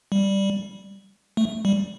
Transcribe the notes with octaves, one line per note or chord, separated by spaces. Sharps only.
G3
A3
G3